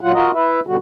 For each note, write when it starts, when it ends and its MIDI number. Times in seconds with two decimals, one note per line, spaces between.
0.01 0.12 46
0.01 0.12 54
0.01 0.12 65
0.01 0.12 78
0.14 0.31 65
0.14 0.31 66
0.14 0.31 70
0.14 0.31 75
0.35 0.60 64
0.35 0.60 71
0.35 0.60 76
0.67 0.77 47
0.67 0.77 50
0.67 0.77 55
0.67 0.77 66